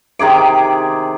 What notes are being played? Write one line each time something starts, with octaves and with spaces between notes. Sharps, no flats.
C3 D#3 G#4 D6